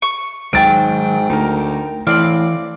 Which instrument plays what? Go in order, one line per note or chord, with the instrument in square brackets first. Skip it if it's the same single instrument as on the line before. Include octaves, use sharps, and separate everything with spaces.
[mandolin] C#6
[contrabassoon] G#2 [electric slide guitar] D#3 F#3 [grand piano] G5 A6 D7
[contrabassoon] D2 [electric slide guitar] D#4 A#4
[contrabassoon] A2 [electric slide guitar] E3 [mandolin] C4 D5 F5